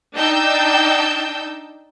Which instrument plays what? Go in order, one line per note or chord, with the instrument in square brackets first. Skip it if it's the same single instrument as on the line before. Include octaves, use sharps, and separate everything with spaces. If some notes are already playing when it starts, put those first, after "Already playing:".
[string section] D4 D#4 G5 A5 E6 G6